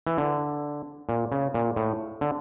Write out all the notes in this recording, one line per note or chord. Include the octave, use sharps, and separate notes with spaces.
E3
D3
A#2
C#3
A#2
A2
D3